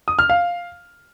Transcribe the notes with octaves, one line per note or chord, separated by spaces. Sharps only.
D#6
F6
F5